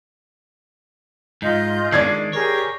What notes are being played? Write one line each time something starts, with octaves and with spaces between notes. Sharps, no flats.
G#2 F4 D#5 G6
D#3 G#3 D4 D5 G#6 C7
G4 G#4 A#4 C#5